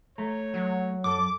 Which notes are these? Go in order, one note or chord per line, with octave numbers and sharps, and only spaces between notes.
A3 C#5 A#5
F#3
F#2 A4 D6